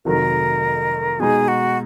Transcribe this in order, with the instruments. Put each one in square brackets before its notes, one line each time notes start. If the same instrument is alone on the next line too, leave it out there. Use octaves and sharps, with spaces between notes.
[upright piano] F1 F2 D#3 F#3 [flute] A#4
[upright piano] B2 G#3 D#4 [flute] G#4
[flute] F#4